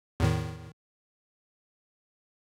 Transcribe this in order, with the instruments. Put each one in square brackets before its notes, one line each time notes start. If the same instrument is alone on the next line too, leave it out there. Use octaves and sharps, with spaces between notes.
[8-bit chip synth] E2 A2 D#3